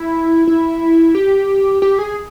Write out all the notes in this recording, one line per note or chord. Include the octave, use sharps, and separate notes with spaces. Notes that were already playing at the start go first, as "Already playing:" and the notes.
Already playing: E4
E4
G4
G4
G#4